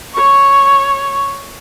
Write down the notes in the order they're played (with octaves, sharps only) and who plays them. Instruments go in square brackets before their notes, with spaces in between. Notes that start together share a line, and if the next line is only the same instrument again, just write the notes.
[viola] C#5 C#6